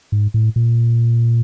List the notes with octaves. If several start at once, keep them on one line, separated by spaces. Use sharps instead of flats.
G#2
A2
A#2